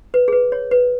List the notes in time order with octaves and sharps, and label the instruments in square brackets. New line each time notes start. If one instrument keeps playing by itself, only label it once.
[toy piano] B4
G#4
B4
C#5
B4